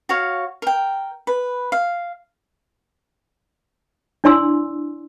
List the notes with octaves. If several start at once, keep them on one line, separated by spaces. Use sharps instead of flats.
F#4 C#5 F5
A#4 G5
B4
F5
D4 E4 D5 G#5 C6 E6